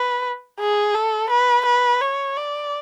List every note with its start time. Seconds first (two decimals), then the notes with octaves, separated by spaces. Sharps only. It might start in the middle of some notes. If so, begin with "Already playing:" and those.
Already playing: B4
0.60 G#4
0.95 A4
1.30 B4
1.66 B4
2.01 C#5
2.37 D5